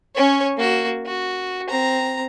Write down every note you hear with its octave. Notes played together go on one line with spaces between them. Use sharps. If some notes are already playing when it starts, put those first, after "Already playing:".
C#4 C#5
A#3 F#4
F#4
C4 A#5